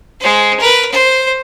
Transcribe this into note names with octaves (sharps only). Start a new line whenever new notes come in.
G#3 C5
A#4 B4
C5